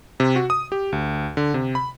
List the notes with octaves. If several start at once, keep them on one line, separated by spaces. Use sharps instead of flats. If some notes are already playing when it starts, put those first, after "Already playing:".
C3
F#4
D#6
G4
D2
D3
C3
B5